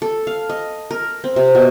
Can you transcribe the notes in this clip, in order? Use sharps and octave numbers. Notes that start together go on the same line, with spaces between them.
A4
F5
D#5
A#4
C4
C3
B2